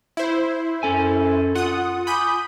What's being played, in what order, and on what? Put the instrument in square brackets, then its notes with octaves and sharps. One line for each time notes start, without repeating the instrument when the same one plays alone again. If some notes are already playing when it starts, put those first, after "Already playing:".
[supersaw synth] E4 C5
[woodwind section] F#2 A4 [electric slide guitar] C#4 G#5
[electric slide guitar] F4 [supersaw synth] F#5 D#6
[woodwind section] G#5 D6 D#6 [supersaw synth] B5 G6 D#7